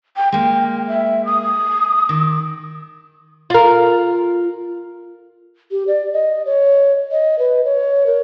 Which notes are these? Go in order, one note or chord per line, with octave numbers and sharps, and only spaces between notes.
G5
G#3 A#3 G5
E5
D#6
D#3
F4 A#4
G4
D5
D#5
C#5
D#5
B4
C#5
A#4